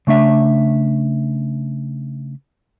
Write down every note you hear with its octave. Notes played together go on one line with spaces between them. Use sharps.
C#3 A3 D4 E5